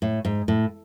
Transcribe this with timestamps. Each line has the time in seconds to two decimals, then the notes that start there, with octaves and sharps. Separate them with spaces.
0.02 A2
0.25 G#2
0.48 A2